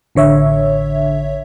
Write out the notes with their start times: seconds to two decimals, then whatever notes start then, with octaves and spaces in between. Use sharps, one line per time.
0.15 A1 D3 C#5 E5